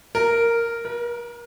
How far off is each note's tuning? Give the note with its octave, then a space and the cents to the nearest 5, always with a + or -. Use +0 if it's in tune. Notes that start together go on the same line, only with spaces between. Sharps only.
A#4 -5
A#4 +40